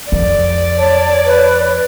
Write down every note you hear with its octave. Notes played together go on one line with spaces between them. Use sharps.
F2 D5
C#5 A5
B4